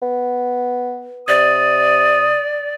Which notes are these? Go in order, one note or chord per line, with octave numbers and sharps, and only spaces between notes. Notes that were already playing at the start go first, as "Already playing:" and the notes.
B3
C3 D5 D#6